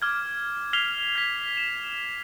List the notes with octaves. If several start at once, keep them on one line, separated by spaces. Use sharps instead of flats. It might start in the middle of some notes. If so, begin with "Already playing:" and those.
D6 F6 G#6
F6 G#6 B6 C7 F7 G7
G#6 B6
E7